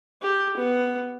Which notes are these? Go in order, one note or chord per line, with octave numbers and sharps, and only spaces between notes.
G4
B3